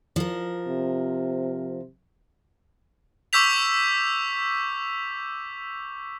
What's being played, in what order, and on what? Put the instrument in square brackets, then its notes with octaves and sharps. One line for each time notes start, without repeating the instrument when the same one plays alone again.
[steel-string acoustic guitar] F3 A#4
[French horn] C3
[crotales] C#6 D6 E6 G6 B6 F7